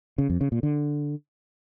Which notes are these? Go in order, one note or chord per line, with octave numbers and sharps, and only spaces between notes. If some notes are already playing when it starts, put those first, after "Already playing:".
C#3
F2
C#3
A#2
D3